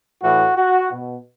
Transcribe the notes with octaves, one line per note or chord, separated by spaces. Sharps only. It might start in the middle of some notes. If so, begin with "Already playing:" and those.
A2 E3 F#4
F#4
B2